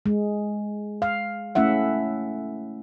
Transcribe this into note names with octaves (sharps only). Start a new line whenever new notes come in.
G#3
F5
A3 C#4 E4 E5 F#5